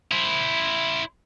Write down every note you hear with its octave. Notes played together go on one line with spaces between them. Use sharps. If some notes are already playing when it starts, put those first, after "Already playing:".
E4 C5